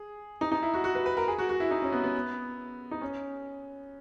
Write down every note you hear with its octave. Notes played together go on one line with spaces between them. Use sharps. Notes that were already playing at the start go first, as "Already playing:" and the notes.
Already playing: G#4
D#4
D#4
E4
F#4
F#4
B4
B4
A#4
G#4
F#4
F#4
E4
D#4
C#4
B3
B3
D#4
C#4